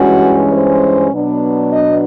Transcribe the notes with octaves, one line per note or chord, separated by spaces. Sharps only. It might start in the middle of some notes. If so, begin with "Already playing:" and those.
Already playing: G2 E3 G#3 C#4 F#4
C5
B2 F#3 B3 D4
D#5